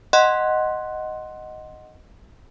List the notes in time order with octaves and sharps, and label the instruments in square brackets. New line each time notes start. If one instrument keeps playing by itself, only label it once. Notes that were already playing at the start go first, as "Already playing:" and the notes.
[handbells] D#5 F#5 C6 F#6